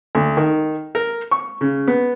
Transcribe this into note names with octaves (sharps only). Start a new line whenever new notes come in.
D2
D#3
A#4
C#6
C#3
B3